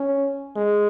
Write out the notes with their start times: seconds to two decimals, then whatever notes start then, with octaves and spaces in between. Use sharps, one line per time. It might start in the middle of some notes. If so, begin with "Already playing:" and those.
Already playing: C#4
0.56 G#3